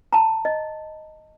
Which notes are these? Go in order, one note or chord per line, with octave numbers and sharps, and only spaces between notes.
A5 A#5
D#5